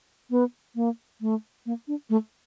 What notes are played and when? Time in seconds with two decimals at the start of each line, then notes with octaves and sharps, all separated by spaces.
0.30 B3
0.75 A#3
1.21 A3
1.66 A#3
1.88 D4
2.10 A3